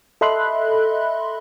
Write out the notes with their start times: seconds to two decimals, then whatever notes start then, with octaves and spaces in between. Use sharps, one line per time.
0.21 A4 D#5 E5 B5 C6 F#6